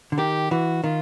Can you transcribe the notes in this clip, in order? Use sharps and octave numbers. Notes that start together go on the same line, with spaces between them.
D3
D#3 G4
E3 F#4
D#3 F4